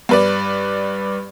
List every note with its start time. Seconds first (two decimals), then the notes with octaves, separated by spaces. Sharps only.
0.09 G2 B4 D5